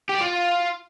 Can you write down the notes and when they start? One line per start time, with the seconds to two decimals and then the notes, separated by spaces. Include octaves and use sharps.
0.09 G4
0.15 D5
0.21 F4